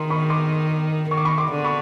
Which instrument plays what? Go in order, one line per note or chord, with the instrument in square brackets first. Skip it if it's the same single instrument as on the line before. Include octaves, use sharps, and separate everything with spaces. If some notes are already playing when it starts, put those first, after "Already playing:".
Already playing: [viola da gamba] D#3 [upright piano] A#5 C6
[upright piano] B5 C#6
C6 D6
[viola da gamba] D#3 [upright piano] C#6
[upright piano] D6
B5 C#6
C6 D6
[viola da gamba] D3
[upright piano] B5 C#6